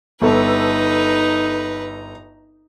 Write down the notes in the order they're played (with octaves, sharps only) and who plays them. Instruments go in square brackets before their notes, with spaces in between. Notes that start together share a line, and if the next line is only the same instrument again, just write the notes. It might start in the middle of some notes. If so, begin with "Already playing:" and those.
[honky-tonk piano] G1 A4 E6 [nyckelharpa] D#4 A#5 [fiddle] B4